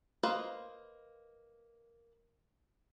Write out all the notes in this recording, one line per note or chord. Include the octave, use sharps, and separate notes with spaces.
A#3 B4 C5 D#5 F5